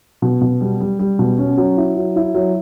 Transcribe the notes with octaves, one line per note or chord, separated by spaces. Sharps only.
B2
B2
G3
G3
G3
B2
C#4
F#3
E4
F#3
E4
F#3